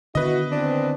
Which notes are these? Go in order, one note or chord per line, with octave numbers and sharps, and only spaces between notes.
B2 D3 D#3 B3 E4 F#4 B4 D#5
E2 E3 C4 D4